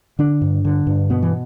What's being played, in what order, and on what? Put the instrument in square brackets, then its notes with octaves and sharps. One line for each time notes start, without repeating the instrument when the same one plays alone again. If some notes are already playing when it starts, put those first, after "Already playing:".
[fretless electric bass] D3 D4
G2
D3
G2
B2 B3
E3